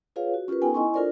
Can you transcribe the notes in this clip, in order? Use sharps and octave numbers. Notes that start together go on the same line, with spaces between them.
F4 G#4 B4 C#5 F5
F#4
C#4 F4 G4 A#4 B4
B3 C#4 D#4 A4 G5 G#5
E4 D#5 G#5 C6 C#6
D4 F4 A4 A#4 C5 D5